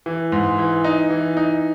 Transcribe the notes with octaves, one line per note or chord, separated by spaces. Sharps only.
E3
G#2
E3
D#4
E3
D#4